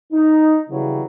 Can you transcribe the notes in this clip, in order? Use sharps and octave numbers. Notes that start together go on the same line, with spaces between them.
D#4
C#3 E3 F#3 G3